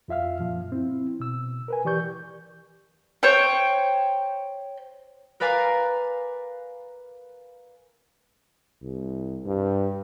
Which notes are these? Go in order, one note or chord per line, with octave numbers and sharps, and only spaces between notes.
F2 F4 E5 F5 F6
F#2 A#2 F3
C4 E4
B2 E6
A#4 B4 G#5
E3 G4 D5 C#6 G6
C5 C#5 G5
A#4 B4 D5 F5 G#5 A#5
C2
G2